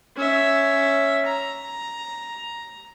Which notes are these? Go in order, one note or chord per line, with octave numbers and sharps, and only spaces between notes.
C#4 E5
A#5